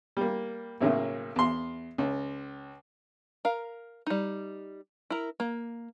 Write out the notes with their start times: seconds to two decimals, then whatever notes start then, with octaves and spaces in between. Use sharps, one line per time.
0.17 G3 A#3
0.80 B1 A2 C#3 A#3
1.36 E2 C6
1.98 C#2
3.45 A#4 F5
4.07 G3 D#4
5.10 E4 A#4
5.40 A#3